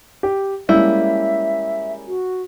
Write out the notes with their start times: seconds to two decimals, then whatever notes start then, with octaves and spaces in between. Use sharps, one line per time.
0.23 G4
0.69 G3 G#3 A#3 C#4 E4 E5
2.07 F#4